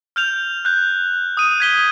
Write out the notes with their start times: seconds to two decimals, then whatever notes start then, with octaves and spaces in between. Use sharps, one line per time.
0.16 F6 G6 F7
0.65 F#6 G6
1.37 D#6 D#7
1.60 G#6 B6 G7